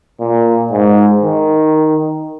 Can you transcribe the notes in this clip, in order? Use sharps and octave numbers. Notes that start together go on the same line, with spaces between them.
A#2
G#2
D#3